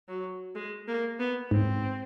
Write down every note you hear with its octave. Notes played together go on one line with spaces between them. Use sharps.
F#3
G#3
A#3
B3
G#2 C4